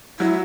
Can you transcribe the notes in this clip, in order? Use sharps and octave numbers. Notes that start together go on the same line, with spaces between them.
F#3 E4